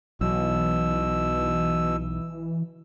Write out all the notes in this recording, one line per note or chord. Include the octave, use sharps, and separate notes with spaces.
B1 B2 E3 E6